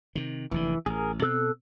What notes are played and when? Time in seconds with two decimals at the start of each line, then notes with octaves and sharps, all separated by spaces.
0.15 C3 D#3
0.51 F1 D#2 D3 E3
0.86 A1 G#4 A#4
1.22 B2 C4 A4 E6 F#6